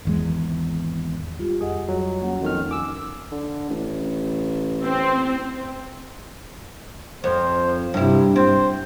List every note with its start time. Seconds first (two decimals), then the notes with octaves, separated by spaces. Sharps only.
0.05 G#1 E2 G#3
1.39 G3 F4 G4
1.61 F2 G#4 D#5 F#5
1.88 F#3 G3 C#5
2.21 A#3 C#4 F#5
2.42 F2 D#3 F6
2.71 G#5 D6 E6
3.32 D3
3.70 A1
4.83 C4
7.24 F2 C5
7.94 G2 C3 E4
8.36 C4 C5